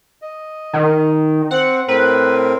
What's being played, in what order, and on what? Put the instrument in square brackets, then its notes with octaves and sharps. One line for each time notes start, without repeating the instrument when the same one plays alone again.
[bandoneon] D#5
[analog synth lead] D#3
[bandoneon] C4 [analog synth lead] F#5
[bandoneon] A2 C4 A#4 [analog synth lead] B4